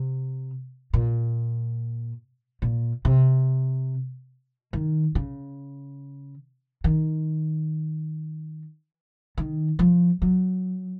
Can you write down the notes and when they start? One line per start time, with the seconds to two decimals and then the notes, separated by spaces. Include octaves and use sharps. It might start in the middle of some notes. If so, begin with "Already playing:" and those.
Already playing: C3
0.94 A#2
2.62 A#2
3.05 C3
4.73 D#3
5.15 C#3
6.84 D#3
9.38 D#3
9.79 F3
10.22 F#3